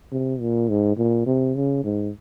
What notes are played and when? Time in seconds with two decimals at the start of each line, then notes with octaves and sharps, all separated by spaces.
0.12 C3
0.40 A#2
0.69 G#2
0.97 A#2
1.26 C3
1.55 C#3
1.84 G#2